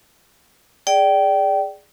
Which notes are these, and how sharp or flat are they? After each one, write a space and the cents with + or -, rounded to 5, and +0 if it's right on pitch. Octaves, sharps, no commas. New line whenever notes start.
G#4 +0 D5 +0 G5 -20